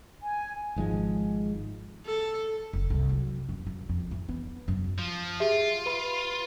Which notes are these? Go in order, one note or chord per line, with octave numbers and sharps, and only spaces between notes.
G#5
G#1 G#2 F3 G#3
A4
F#1
C2
F#3
F#2
F#2
F2
E3
B3
F#2
F3
F4 G4 G#4 E5
B4 B5